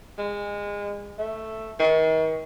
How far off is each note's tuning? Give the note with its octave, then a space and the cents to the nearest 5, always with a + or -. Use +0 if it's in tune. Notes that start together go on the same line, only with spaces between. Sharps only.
G#3 -25
A3 +5
D#3 +40